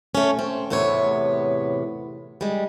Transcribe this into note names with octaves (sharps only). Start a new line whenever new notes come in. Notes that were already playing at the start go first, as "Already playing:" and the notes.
A3 C#4
C4
E2 A2 C3 B3 C#5
G3 G#3